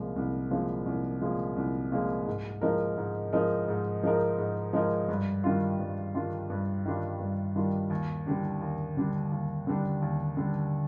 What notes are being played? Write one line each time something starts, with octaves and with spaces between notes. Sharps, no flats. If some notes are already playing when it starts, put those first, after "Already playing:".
Already playing: C2 A#2 F3 G#3
C2
A#2 F3 G#3
C2
A#2 F3 G#3
C2
A#2 F3 G#3
G#2
F3 G#3 D#4 A#4
G#2
F3 G#3 D#4 A#4
G#2
F3 G#3 D#4 A#4
G#2
F3 G#3 D#4 A#4
G2
D#3 G3 D4 F4
G2
D#3 G3 D4 F4
G2
D#3 G3 D4 F4
G2
D#3 G3 D4 F4
D#2
D3 G3 D4
D#2
D3 G3 D4
D#2
D3 G3 D4
D#2
D3 G3 D4